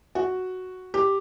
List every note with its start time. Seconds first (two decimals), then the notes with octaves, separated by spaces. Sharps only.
0.15 F#4
0.94 G4